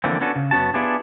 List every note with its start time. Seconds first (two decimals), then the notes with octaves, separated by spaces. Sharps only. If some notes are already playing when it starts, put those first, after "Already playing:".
0.04 D3 E3 F3 A3 A#3 C4
0.21 B3 C#4 D4 F#4 A4 B4
0.36 C#3
0.51 F#2 B3 C#4 F#4 A5
0.74 B3 D4 E4 F4 G4 G#4